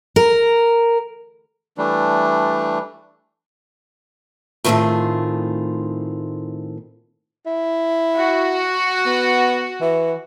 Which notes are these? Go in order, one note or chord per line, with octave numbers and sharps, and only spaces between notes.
A#4
E3 G3 A3 D4
A2 D#3 A3 C4 F4 G#4
E4
F#4
B3
E3